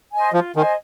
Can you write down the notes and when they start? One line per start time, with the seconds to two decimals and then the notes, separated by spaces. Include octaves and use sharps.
0.12 C5 D#5 G#5
0.33 F3 F4
0.56 D#3 C5 D#5 G#5